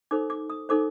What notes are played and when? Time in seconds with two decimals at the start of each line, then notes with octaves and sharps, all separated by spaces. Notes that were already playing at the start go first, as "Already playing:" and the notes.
0.11 D#4 A4 C5 D6
0.30 D6
0.50 D#6
0.69 D#4 A4 C5 D6